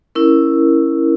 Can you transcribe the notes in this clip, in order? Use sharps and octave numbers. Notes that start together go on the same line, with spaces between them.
C#4 E4 A#4